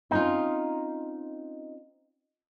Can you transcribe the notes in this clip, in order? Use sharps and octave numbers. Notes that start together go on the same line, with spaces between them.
C4 C#4 D#4 F4